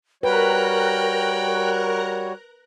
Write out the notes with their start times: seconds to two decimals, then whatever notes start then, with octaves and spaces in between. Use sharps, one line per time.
0.23 G3 F#4 A#4 B4 C#5 G5 A#5 F#6